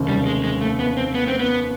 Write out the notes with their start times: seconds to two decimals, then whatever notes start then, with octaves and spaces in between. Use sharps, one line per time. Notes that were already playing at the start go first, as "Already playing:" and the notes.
Already playing: F1 D#2 C#3
0.09 G3
0.26 G#3
0.44 G#3
0.61 A3
0.79 B3
0.97 C4
1.14 B3
1.27 C4
1.39 B3